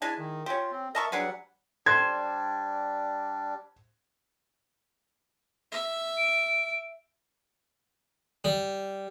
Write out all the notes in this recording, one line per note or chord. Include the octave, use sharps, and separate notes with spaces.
G#3 D4 E4 G#5 A5
D#3
C#4 F4 G4
C4
A#4 D#5 E5 A5 C#6
F#3 G3 D4 G#4 B4 F#5
G3 D4 C5 G#6
E5
D7
G3